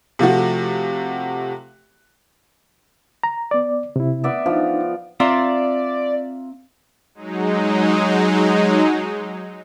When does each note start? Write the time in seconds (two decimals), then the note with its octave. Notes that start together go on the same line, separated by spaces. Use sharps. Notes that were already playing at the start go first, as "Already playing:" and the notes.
0.19 C3 F3 A3 F#4
3.23 A#5
3.51 B3 D5
3.96 C3 E4
4.24 B3 D5 E5
4.46 F3 D4 D#4
5.20 C4 F4 D5 E5 A#5 C6
7.15 F#3 G#3 D#4